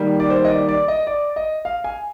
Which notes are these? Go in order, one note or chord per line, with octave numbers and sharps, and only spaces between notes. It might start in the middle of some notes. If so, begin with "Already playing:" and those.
Already playing: D#3 G3 A#3
D5
C5
D#5
D5
D5
D#5
D5
D#5
F5
G#5